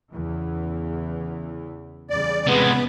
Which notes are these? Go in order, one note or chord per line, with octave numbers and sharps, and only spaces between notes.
E2 C#3 E3
E2 C#3 G3 D5
C3 G#3 B3